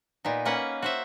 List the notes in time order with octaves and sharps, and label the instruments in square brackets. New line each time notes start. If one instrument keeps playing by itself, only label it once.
[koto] A#2 B3 D#4
A#3 C#4 B4 F#5
F#4 C5 E5